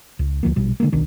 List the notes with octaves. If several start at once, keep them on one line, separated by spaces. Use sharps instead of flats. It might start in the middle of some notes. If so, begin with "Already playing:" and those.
C#2
D2 F3 A#3
A#1 B2 G3
D3 D#3 G#3 A#3
D1 B1 D#3 D4